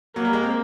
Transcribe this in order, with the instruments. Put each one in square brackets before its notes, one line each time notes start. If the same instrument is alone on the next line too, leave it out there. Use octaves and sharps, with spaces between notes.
[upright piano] F#3 [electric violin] A#3
[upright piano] G3
G#3
C4